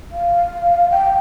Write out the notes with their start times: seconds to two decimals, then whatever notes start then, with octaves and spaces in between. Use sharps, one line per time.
0.12 F5
0.91 G5